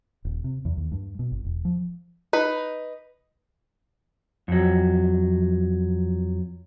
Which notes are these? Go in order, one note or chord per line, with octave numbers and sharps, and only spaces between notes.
D#1
C3
E2
D#2
G2
B2
G1
E1
F3
D#4 B4
F2 F#3